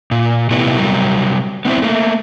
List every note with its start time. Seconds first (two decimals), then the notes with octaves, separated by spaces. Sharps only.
0.11 A#2
0.50 C3 A3 B3 E4 G4 B4
0.78 C3 F#3 G3 A#4
1.65 B3 C4 E4 C5
1.82 A3 A#3